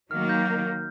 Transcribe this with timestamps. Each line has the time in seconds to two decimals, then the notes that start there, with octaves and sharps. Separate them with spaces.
0.10 D#3 F#3 A#3 F6
0.29 G6